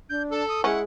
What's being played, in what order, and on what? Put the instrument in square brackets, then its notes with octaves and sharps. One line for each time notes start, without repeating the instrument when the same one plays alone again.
[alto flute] D4 [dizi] G6
[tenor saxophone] A4 [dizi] A5
[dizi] D#6
[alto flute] G#3 [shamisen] C#4 [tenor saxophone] E4 [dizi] F#5